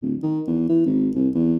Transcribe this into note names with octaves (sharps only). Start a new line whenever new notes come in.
D1
D#3
E2
E3
G#1
C2
E2